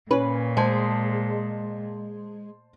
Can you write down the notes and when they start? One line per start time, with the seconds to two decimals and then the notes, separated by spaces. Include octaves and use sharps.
0.11 A#2 C#4 B4
0.57 G#3 C5 A5